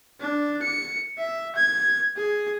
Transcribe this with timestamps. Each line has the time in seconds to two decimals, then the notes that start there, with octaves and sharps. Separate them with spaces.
0.21 D4
0.63 C#7
1.19 E5
1.56 G#6
2.17 G#4